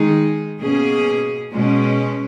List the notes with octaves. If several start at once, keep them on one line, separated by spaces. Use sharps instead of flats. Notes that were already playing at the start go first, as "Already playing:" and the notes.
Already playing: D#3 G#3 D#4 G#4
B2 A#3 C#4 G#4
B2 G#3 C#4